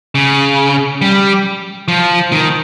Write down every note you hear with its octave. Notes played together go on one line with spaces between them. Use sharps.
C#3
G3
F3
D#3